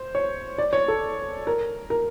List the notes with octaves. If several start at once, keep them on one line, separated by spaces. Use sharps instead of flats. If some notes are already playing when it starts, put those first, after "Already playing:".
Already playing: C5
C#5
D5
C#5
A4
A#4
A#4